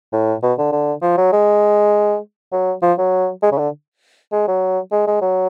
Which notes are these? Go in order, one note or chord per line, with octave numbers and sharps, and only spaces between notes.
A2
B2
D3
D3
F3
F#3
G#3
F#3
F3
F#3
G#3
C#3
D3
G#3
F#3
G#3
G#3
F#3